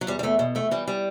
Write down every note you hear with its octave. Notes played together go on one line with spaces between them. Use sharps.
F#3
E2 G3
G3
E2 A3
B2
E2 A3
E3 G3
G3